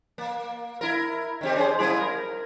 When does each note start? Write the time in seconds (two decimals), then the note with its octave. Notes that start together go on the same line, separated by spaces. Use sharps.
0.18 A#3
0.81 E4 A#4
1.41 D#3 C4 G4
1.56 C#4 G#4 C5
1.79 G3 A#3 E4
1.99 A#4